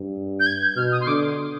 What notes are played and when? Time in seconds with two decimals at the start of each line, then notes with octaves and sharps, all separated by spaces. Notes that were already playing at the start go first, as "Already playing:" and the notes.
Already playing: G2
0.40 G6
0.47 G#6
0.62 G6
0.76 B2 F6
0.92 D#6
1.01 C6
1.07 D3 D6